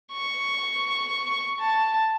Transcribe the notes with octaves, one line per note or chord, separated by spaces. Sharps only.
C#6
A5